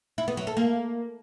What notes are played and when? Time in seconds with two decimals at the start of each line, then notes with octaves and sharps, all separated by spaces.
0.18 E4
0.28 B3
0.37 F#3
0.47 A4
0.57 A#3